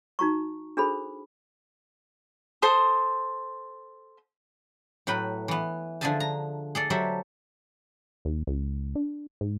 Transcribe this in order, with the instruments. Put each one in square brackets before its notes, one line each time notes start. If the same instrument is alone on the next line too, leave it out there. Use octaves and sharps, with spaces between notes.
[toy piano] D#4 F#4 A#5 C#6
D4 F#4 G#4 A4 C5 B5
[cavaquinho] A4 C5 C6 D#6
[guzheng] A2 F#3 B4 G5 B5
E3 B3
D3 F3 G#4 E5 G#5 A5
A#5
G#4 A4 D5
F#3 G4 A4 C5 D5 E5
[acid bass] D#2
C#2
D4
G#2